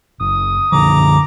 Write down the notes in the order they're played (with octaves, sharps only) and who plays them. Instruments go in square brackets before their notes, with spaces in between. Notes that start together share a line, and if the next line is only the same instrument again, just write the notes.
[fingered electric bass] F#1 [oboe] D#6
[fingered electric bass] F#2 D3 F3 [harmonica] A#5 D6